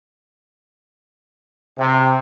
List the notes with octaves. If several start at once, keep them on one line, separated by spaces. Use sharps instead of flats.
C3